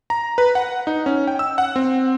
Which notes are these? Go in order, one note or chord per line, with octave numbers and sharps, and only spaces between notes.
A#5
B4
F#5
D#4
C#4
G5
E6
F#5
C4